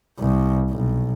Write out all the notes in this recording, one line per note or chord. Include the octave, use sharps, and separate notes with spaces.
C2
B1